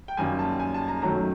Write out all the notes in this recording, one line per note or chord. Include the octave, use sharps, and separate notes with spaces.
G5
F#2 D#3 G3 A#3 G#5
A5
G#5
A5
A#5
F#2 D#3 F#3 A3 A#5